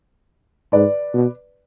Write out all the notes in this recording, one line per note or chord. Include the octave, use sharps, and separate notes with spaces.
G#2 B4 D5
B2